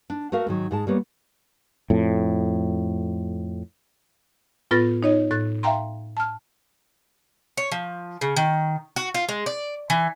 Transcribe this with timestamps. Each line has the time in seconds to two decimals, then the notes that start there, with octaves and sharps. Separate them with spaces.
0.10 D4
0.32 A3 F#4 A4 A#4 F5
0.47 G#2 D#3 F#3
0.71 G#2 G#3 A5
0.87 G3 A#3 B3 C#5
1.90 F2 A2
4.71 A2 B3 F4 B4 A6 A#6
5.03 D#4 C#5 D#5
5.31 A2 F#6 A6
5.63 E5 F5 G5 A#5 C6
6.17 A5 F6
7.57 C#5
7.72 F3
8.21 C#3
8.36 D#3
8.96 F#4
9.14 F4
9.29 G#3
9.46 D5
9.90 E3